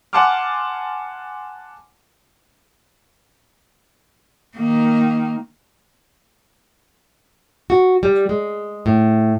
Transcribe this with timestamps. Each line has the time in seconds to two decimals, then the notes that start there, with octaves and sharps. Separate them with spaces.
0.13 F#5 G#5 A5 C6 D6 F6
4.56 D#3 A#3
7.70 F#4
8.03 G3
8.29 G#3
8.86 A2